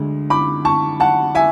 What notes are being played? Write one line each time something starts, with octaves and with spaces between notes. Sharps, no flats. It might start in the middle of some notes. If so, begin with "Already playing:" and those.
Already playing: D2 D3 G#3
B5 D6
A5 C#6
F#5 A5
E5 G#5